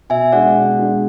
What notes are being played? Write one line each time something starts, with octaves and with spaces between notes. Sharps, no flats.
B2 E5 G#5
G#3 D4 D5 F#5
B2
G#3 D4